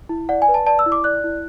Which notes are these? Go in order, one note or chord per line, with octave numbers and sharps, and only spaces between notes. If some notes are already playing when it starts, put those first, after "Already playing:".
E4
D5 F#5
G#5
B4
A5
D5 A5
E6
E4
D6
D5 F#6
E4